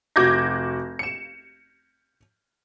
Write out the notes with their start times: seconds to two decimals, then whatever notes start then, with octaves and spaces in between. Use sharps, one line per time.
0.16 F1 F#4 D6 G6 G#6 A#6
0.99 C#7 E7